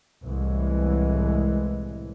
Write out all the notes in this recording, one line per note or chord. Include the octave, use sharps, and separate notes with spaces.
C2 A2 E3 G#3